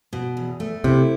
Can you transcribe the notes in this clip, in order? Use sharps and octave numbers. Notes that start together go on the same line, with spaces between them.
B2
E2
A3
C3 E4